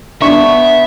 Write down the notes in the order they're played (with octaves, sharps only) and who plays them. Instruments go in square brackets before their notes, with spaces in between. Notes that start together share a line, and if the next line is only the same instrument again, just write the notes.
[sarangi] B3 [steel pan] D4 C#6 [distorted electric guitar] E5